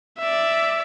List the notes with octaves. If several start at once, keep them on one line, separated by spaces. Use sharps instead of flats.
D5 E5